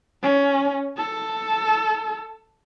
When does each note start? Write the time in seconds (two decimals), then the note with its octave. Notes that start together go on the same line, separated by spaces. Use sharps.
0.23 C#4
0.97 A4